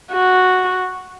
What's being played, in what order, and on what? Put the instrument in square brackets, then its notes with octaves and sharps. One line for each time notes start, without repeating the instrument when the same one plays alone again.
[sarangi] F#4